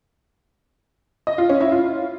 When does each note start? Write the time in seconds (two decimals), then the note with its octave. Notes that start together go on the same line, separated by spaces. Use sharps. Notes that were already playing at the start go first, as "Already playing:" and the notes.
1.27 D#5
1.38 F4
1.49 C#4
1.61 E4
1.72 F4